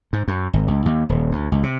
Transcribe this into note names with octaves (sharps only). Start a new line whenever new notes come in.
G#2
F#2
G#1
C#2
D#2
D#1
D2
C#2
C3